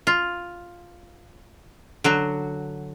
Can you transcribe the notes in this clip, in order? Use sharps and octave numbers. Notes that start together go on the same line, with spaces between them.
F4
D3 F#3 F#4